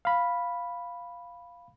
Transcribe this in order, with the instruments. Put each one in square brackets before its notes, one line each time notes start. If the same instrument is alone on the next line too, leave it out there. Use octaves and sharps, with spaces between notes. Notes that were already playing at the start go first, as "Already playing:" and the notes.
[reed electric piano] F5 B5